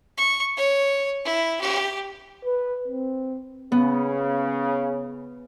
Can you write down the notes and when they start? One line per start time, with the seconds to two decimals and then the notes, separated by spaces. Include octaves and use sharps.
0.17 C#6
0.57 C#5
1.25 E4
1.61 G4
2.45 B4
2.88 C4
3.72 C#3 B3